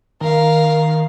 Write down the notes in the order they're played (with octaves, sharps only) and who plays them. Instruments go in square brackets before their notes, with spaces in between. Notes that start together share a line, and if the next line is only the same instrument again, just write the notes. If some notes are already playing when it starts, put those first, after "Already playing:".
[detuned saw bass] D#3 [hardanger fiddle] A#4 F5